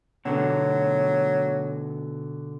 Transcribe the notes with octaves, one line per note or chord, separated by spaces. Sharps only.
B2 D3 F#3 B3